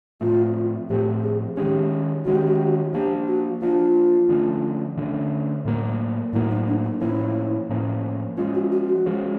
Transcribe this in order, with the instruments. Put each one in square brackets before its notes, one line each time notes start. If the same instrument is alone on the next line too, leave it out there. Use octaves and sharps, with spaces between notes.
[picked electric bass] A2 F3 A3 C4 [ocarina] F4
[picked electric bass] A2 F3 A3 C4 [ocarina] G4
[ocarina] G#4
[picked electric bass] D#3 G#3 C#4 [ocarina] G4
[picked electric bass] D#3 G#3 C#4 [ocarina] F#4
[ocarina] G4
F#4
G4
F#4
[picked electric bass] F3 A#3 D4 [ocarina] G4
[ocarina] F#4
[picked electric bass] F3 A#3 D4 [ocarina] F4
[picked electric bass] D3 F3 A3 C#4
D3 F3 A3 C#4
A2 F#3 A#3
[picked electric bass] A2 F#3 A#3 [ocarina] E4
[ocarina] D#4
D4
D#4
[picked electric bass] A2 F3 A#3 C#4 [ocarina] E4
[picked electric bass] A2 F3 A#3 C#4
[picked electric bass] F3 G#3 C#4 [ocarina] F4
[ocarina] F#4
F#4
F#4
[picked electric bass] F3 G#3 C#4